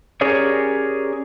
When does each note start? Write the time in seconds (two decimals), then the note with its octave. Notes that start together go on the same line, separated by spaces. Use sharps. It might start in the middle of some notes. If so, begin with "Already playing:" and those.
0.21 C#4 G4 G#4 A#4 C#5 D5